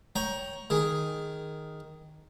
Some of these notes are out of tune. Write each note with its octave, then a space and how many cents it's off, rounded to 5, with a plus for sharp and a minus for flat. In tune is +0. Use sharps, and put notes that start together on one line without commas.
C#5 +0 G5 +0 A#5 +20
D#3 +0 G#4 +0